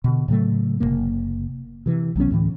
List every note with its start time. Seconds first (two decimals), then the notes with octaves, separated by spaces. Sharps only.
0.04 B2 D3
0.28 A2 C#3 F#3 A3
0.80 F#1 F#2 C3 A#3
1.86 C3 E3
2.16 B1 F#3 B3 C#4
2.31 D2 A2 E3